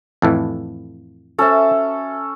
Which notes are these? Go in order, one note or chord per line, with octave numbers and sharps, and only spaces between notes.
F2 A2 E3
C#4 F#4 A4 C5 E5